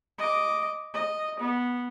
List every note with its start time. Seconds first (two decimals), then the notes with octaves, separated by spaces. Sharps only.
0.18 D#5 D6
0.94 D#5
1.40 B3